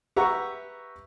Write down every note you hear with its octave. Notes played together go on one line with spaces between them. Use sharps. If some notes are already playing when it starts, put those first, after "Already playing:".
G4 B4 E5 F#5 A#5 C#6